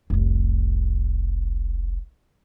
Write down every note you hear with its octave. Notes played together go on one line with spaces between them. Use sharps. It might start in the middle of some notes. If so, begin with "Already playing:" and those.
F1 C2